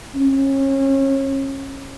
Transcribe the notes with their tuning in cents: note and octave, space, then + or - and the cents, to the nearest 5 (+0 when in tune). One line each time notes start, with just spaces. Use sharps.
C#4 -30